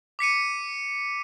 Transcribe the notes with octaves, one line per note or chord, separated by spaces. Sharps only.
D6 B6 C#7 D#7